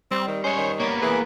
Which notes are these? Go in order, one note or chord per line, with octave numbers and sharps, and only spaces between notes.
G3 C4
D#3
G#3 C#4 C5 C#5
D#3
A#3 B3 C#5
E3 G#4 B4